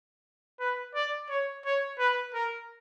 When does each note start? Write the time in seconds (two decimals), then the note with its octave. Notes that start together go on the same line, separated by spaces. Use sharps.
0.60 B4
0.95 D5
1.30 C#5
1.65 C#5
1.99 B4
2.34 A#4